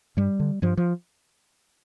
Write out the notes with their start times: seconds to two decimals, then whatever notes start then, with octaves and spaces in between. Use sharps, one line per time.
0.17 G2 G3
0.40 D3
0.62 G2 F3
0.77 F3